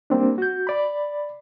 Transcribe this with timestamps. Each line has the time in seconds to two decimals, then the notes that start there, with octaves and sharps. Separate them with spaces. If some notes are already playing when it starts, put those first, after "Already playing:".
0.10 G3 A#3 C4 D4
0.38 F#4 G6
0.67 D5 B5